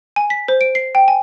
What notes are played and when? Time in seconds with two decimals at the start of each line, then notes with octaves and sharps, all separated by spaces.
0.16 G#5
0.30 B6
0.48 C5
0.61 D7
0.75 C7
0.95 G5
1.08 G#5